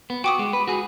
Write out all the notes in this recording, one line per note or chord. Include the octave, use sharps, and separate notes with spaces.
B3
F#4 G5 D6 D#6
G#3
B4
F#4 G#4